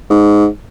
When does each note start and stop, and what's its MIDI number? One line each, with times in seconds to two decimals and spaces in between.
0.10 0.47 44